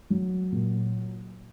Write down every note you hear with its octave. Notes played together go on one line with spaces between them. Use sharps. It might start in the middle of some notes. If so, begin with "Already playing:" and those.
F#3
A#2